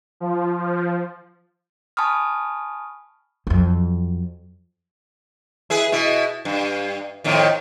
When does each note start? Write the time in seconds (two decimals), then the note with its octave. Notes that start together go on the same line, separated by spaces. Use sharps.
0.20 F3
0.58 F3
1.97 G#5 A5 B5 C#6 D#6 F6
3.47 F2 F#3
5.70 E4 G#4 B4
5.92 B2 E4
6.45 G2
7.24 F2 A2 D#3